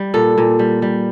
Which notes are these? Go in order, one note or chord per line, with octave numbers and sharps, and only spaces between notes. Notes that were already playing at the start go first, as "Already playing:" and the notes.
Already playing: G3
A#2 A4
A#2
G3
G3